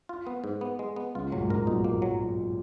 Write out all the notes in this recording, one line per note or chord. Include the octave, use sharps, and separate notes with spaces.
F4
B3
G#2
B3
G#3
B3
C#2 C#3 F4
A#2 F#3
G#2
A#2 A#4
B1 B2 D#4
A#3
F#3